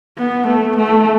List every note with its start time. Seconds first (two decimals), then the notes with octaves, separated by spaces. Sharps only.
0.18 B3
0.47 A3
0.77 A3